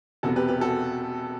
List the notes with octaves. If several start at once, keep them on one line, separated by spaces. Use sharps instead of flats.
E1 E2 C3 F#4 A4
G4 B4
G4 B4
F#4 A4